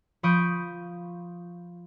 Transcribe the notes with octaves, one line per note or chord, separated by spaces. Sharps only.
F3 B5 C#6 D#6 G6 D7